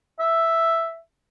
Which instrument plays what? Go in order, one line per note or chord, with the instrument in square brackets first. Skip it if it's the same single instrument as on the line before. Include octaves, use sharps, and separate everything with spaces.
[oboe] E5